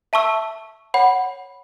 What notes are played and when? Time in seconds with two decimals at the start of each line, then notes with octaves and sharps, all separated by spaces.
0.13 E5 A5 C#6 E6
0.94 C#5 F#5 B5